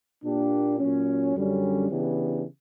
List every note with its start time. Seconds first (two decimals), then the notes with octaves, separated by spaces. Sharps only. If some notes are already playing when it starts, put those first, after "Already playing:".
0.23 A#2 A#3 D4 G4
0.79 A#2 F#3 C#4
1.34 F#2 D3 G3 C#4
1.90 C#3 E3 B3 D4 G4